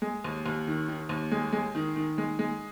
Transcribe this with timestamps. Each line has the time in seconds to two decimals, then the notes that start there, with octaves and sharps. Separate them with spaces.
0.02 G#3
0.24 D#2
0.46 D#2
0.67 D#3
0.88 D#3
1.09 D#2
1.32 G#3
1.53 G#3
1.75 D#3
1.96 D#3
2.18 G#3
2.39 G#3